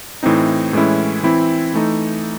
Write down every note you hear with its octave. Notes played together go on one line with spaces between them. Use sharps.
A2 E3 C4 D#4
A2 E3 G#3 C#4 E4
E3 C4 E4
E3 A3 D#4